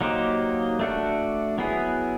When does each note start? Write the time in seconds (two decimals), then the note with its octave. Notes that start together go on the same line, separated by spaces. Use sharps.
0.01 F#3 A#3 D#4 G4 C5
0.80 A3 D4 F#4
1.58 F#3 B3 E4 G#4